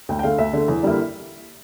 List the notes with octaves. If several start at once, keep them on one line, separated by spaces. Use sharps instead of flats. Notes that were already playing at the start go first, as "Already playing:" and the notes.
D2 G5
G5
D3 A3 F5
D2 E5
D3 A3
E2
D3 G3 A#3 E4